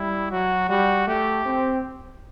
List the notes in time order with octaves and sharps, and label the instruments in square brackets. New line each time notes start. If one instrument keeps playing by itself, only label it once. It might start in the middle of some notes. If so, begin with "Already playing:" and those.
Already playing: [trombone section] G3 [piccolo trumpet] E4
[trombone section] F#3 [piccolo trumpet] F#4
[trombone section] G3 [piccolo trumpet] F#4
[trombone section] A3 [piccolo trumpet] G4
[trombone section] C4